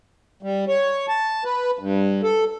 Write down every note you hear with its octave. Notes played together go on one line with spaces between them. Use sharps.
G3
C#5
A5
B4
G2
A4